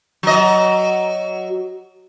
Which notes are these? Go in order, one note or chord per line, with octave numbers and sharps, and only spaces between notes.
F#3 D#5